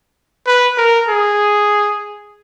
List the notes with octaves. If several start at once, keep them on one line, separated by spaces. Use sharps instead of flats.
B4
A#4
G#4